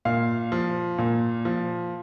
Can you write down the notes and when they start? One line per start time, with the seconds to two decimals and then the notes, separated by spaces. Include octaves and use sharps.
0.05 A#2 F5
0.52 F3
0.98 A#2
1.45 F3